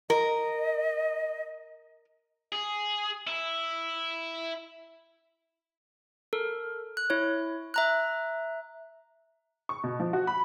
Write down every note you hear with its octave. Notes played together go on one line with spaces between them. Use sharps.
A#4 D#5
G#4
E4
A4 A#4
F#6
E4 C#5
E5 A#5 F#6
C#6
B2
F3
F#4
B5